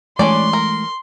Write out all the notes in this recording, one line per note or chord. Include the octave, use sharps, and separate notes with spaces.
E3 G#3 A3 C#4 D4 D5 C6
A#4